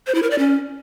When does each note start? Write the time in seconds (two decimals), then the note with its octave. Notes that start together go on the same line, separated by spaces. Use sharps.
0.07 C5
0.15 E4
0.23 A#4
0.30 D5
0.38 C#4